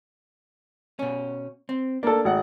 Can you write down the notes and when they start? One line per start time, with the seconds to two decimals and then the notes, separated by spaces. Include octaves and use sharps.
0.99 B2 C#4
1.69 C4
2.03 A#3 D4 A4
2.24 G#1 F#5